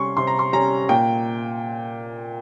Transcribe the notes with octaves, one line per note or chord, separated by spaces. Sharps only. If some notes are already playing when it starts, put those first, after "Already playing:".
Already playing: C3 G3 C#4 C6 C#6
C3 C6
A#5
C6
G3 C#4 A#5
A#2 G5